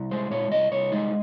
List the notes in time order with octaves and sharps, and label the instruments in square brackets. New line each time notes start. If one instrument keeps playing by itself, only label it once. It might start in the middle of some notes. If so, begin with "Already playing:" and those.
Already playing: [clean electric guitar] C2
G#3 C5
A#2 C#5
C2 D#5
C2 C#5
G#3 D#4